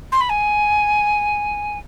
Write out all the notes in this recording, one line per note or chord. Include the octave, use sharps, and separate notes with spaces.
C6
B5
G#5